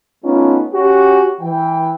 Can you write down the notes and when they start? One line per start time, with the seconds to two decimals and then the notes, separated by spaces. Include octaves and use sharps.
0.24 A3 B3 C#4 D#4 F4
0.74 C#4 F#4 G4
1.41 E3 G5